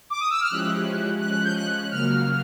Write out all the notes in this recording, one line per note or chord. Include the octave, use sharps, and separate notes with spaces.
D6
D#6
E6
F6
F3 G#3 C#4 E4 G4 F#6
F3 G#3 C#4 F#6
F#6
G6
F#6
C#3 F#3 A#3 F6